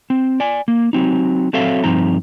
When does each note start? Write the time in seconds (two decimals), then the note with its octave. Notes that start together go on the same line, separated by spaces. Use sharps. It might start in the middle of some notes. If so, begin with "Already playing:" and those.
0.10 C4
0.40 D5 G#5
0.68 A#3
0.93 F#3 C4 D#4
1.53 F#3 C4 A4 C#5 E5 F5
1.84 G2 F3 C4 D#4 A#5